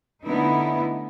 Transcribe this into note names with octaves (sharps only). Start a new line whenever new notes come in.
D3 A3 B3 D#4 E4